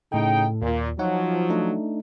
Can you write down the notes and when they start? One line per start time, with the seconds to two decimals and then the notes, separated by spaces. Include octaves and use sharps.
0.12 A2 C#3 D#4 A4 G5
0.62 D#2 A#2
0.99 F3 F#3 D#4 C#5 F#5
1.50 A3 D4 D#4